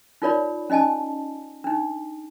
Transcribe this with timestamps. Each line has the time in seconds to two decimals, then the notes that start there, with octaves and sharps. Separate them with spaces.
0.22 D#4 F4 A#4 C#5 D5 B5
0.70 C#4 D#4 D#5 G#5 A5
1.64 D4 D#4